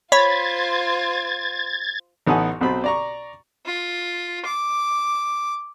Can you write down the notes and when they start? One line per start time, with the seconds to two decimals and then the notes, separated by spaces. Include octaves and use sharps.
0.12 F4 C5 C#5 B5 G#6 A6
2.27 A1 B3 D#4 A4 F#5 G#5
2.61 B1 B2 C4 B5
2.84 D5 A#5 C#6
3.66 F4
4.46 D6